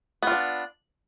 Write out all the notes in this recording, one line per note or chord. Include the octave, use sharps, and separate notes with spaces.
B3 D4 F4